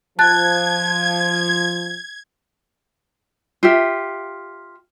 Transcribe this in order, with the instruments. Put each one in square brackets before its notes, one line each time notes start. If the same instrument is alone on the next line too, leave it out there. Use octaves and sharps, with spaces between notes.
[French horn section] F3 [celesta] A5 F#6 A6 [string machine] G#6
[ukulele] F4 G4 E5